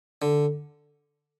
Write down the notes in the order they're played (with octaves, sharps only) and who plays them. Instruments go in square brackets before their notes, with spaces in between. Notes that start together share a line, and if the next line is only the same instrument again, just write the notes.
[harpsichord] D3